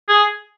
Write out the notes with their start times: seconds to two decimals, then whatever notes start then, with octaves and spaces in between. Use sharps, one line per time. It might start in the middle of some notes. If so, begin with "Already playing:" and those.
0.09 G#4